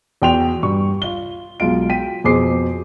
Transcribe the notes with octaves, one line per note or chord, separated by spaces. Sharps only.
E2 F#4 G5 C6 F7
G2 C#6
F4 G7
B1 G#3 F4 D7
G5 B6 D#7
F2 B2 G#4 C5 D6 C7